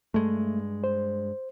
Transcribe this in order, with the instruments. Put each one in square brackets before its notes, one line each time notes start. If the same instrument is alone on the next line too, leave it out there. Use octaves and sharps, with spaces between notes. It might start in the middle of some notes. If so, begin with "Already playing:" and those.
[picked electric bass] G2 G#3 [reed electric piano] A3
[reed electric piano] C5